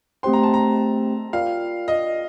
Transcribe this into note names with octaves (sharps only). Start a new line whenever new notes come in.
A3 C4 G4 C5 G5 C6
A#5
A5
A#5
F4 A#4 D5 F5 G5
D#5